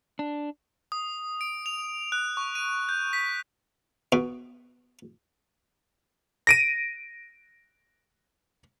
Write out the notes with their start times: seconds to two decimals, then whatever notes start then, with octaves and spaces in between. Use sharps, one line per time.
0.19 D4
0.92 D#6
1.41 D7
1.66 F7
2.12 F#6
2.37 C#6
2.55 D#7
2.89 G6
3.13 B6
4.12 B2
6.47 A#6 D7 D#7